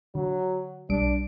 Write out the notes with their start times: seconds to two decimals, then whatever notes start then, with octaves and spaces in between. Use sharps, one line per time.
0.15 D3 F#3
0.90 B1 G3 D4 D7